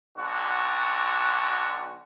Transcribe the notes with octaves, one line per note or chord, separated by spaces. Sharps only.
B1 D3 F#4